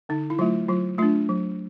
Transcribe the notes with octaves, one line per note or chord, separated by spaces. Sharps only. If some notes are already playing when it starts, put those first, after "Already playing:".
D3 D#4
E4
F#3 A3 F4
F#3 F4
A3 D4 F4
F#3